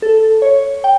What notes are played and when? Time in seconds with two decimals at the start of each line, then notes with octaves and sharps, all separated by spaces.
0.02 A4
0.42 C#5
0.84 G5